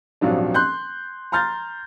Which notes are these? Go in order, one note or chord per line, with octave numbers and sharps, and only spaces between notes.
D#1 G#1 F3 F#3 D4
C6 F#6 G6
A#5 C6 F6 G6 A6